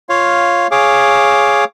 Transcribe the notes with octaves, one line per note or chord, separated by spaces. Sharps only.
F4 C#5 F5
G#4 C#5 F5 D6